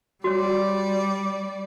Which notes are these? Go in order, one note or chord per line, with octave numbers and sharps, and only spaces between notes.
G3 F#4 C#5 D5